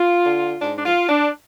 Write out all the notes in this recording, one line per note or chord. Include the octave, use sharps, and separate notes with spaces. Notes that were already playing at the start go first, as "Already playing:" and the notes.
Already playing: F4
D3
G#2 D4
D4
F4
D4